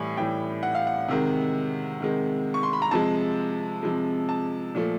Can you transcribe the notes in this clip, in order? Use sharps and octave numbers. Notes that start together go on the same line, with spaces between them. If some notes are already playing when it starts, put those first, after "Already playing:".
Already playing: A2 E3 G3 G#5
A2 E3 G3 G5
F#5
F5
F#5
C3 D#3 G#3
C3 D#3 G#3
C#6
C6
B5
A#5
C3 F3 G#3 A5
C3 F3 G#3
A5
A#2 F3 A3